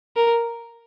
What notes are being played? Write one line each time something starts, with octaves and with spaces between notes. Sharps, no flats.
A#4